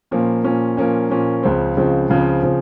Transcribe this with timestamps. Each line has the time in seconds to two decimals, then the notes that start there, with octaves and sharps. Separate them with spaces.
0.11 A#2 F3 A#3 C#4
0.44 A#2 F3 A#3 C#4
0.77 A#2 F3 A#3 C#4
1.10 A#2 F3 A#3 C#4
1.43 C#2 C#3 F3 C4
1.77 C#2 C#3 F3 C4
2.09 C#2 C#3 F3 C4
2.43 C#3 F3 C4